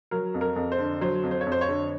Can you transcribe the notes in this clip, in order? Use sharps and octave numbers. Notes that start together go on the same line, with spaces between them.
F#3 A#4
F2
A#4
F2
C5
D3
F#3 C5
F2
C5
C#5
F2
C5
C#5
D3